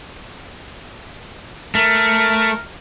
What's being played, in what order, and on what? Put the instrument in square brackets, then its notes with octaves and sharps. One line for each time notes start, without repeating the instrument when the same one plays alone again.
[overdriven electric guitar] A3 [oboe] A#4